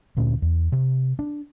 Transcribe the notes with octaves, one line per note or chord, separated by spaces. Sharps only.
D2 A#2 A3 C#4
E2
C3
D4